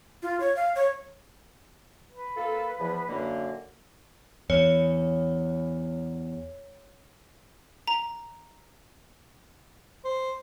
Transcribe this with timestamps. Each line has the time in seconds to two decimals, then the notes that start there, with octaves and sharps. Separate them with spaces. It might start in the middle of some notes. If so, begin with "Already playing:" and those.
0.23 F4
0.40 C#5
0.56 F5
0.76 C#5
2.12 B4
2.37 A#3 F4 A4
2.80 E2 F3
3.09 F#2 D3 A#3
4.50 E2 C#5
7.88 A#5
10.05 C5